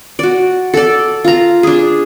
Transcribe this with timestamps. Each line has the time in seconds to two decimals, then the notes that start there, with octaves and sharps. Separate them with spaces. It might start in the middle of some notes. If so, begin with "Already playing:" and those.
0.19 F#4 D5
0.74 A4 D5
1.24 F4 A#5
1.63 D4 G#4